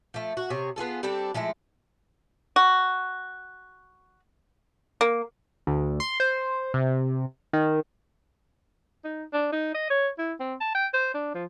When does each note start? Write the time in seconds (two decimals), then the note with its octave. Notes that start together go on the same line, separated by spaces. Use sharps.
0.14 F3 A3
0.37 F#4
0.50 C3 G#4 C#5
0.76 B3 F4 G#4 A4
1.03 G3 C4 D4 A4
1.34 F3 G#3 A3 E4
2.56 F#4
5.01 A#3
5.67 D2
6.00 C6
6.20 C5
6.74 C3
7.53 D#3
9.04 D#4
9.33 D4
9.52 D#4
9.74 D#5
9.90 C#5
10.18 E4
10.40 C4
10.61 A5
10.75 G5
10.94 C5
11.14 D4
11.34 F3